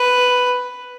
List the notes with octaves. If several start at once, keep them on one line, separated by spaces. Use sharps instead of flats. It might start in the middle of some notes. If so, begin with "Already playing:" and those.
Already playing: B4